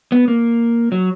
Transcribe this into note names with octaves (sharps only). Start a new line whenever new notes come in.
B3
A#3
F#3